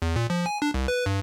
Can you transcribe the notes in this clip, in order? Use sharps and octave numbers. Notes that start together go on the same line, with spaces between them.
E2
A#2
F3
G#5
D4
C2
B4
G2